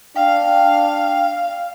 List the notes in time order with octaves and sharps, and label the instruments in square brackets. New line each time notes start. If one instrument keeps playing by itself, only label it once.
[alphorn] D4 [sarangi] F5 [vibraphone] G5